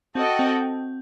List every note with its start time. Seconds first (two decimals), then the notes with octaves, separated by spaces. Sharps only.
0.15 C4 F#4 A4 D#5 G5
0.39 C4